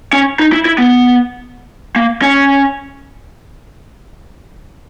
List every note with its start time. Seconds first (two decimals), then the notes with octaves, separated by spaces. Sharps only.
0.13 C#4
0.39 D#4
0.53 E4
0.65 E4
0.78 B3
1.96 A#3
2.22 C#4